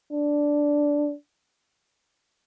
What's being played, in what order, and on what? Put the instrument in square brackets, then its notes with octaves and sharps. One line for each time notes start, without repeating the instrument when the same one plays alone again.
[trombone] D4